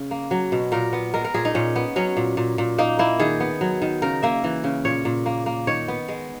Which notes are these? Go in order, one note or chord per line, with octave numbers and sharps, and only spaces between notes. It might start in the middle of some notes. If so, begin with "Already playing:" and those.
Already playing: C#3
A#3
F#3
B2
A#2 A#4
B3
G#3 A#4
A#4
A#2 G#4
D#4
A#2 C#4
B3
F#3 C#4
A#2
A#2
A#2
A#3 D#4
A#3 E4
D#3 G#4
B3
F#3
D#3
C#3 A#4
A#3 E5
E3
C#3
A#2 C#5
A#2
A#3
A#3
D#3 C#5
B3
G#3